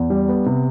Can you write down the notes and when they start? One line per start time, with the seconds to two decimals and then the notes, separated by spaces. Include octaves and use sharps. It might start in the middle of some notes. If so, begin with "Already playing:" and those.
Already playing: E2
0.10 G3
0.29 B3
0.46 C3